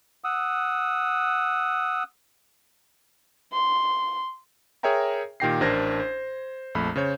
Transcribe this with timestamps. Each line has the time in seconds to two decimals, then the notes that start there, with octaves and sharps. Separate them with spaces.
0.24 F#5 D#6 E6
3.53 C6
4.83 G#4 A#4 C#5 E5 G5 A#5
5.40 A#2 D#3 G4 G5 A#6 C7
5.61 A1 D4 A#4 C5 G#6 A#6
6.00 C5
6.75 A#1 F2 A3 B5
6.96 C#3 C5 C#5 G6